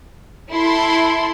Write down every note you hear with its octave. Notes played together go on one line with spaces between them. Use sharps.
E4 A4 C6